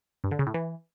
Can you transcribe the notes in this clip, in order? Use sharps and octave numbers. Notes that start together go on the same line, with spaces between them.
G2
D3
C#3
A2
E3